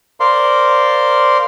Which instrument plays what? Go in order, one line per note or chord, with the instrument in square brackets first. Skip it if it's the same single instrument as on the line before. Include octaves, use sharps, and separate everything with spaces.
[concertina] A#4 C5 D5 F5 C6